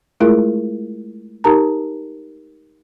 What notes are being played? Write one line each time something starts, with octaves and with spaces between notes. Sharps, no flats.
G#3 A3 E4 F4 G#4 A#4
D#4 G4 A#4 A5 A#5